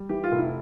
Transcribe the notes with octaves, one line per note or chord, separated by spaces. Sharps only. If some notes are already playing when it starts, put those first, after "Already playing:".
Already playing: G3
E3 G4
F4
F1
E4